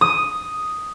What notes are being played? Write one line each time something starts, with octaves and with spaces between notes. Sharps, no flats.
D#6